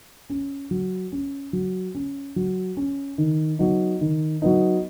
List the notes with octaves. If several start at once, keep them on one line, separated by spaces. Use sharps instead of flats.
C#4
F#3
C#4
F#3
C#4
F#3
C#4
D#3
F#3 B3 D#4
D#3
F#3 B3 D#4